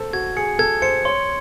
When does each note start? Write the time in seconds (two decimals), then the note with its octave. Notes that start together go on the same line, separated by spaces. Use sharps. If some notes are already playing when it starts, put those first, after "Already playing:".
Already playing: A4 C5
0.13 F#4 G#6
0.36 G#4 C#7
0.59 A4 G#6
0.82 C5 C#7
1.05 C#5 C6